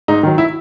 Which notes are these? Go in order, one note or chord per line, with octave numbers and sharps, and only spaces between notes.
G#2 D#4
D#3 F#3
E4